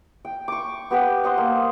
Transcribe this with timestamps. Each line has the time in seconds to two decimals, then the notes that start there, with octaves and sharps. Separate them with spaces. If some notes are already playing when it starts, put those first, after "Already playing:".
0.25 G5
0.48 C#6 D6
0.90 B3 G4 B4 G5
1.24 C5 D#5 F#5
1.38 A#3